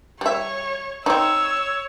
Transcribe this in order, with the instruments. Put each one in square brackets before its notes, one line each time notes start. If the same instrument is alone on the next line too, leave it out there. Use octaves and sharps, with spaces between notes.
[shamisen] G3 E5 [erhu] C#5
[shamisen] C4 D#4 [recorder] C#5 [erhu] E6